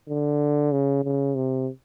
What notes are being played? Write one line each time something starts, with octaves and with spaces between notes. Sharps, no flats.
D3
C#3
C#3
C3